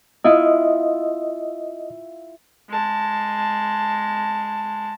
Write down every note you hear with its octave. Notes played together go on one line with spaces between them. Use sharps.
E4 F4 D#5
G#3 A5